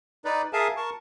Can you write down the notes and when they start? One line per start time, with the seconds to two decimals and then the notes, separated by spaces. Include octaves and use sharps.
0.25 D#4 B4 D5
0.53 G#4 A#4 E5 F5 G#5 A5
0.77 A#4 A5 C#6